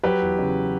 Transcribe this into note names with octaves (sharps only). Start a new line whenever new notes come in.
F#3 G4 B4
E2
C#3